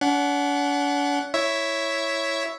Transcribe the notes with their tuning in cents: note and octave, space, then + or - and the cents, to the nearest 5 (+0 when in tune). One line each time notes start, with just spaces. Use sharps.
D4 -45 F#5 +0
E4 +0 C#5 +0 E5 +0